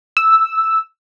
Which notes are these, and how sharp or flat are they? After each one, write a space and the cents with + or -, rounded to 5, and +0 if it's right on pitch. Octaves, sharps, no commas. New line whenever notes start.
E6 -5